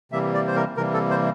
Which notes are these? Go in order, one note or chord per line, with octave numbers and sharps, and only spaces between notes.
C3 E3 G3 A#3 E5
D5
C5
A#4
C3 E3 G3 A#3 A#4
A4
C5